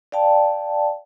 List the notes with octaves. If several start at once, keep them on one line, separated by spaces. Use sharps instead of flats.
D5 F5 G5 A5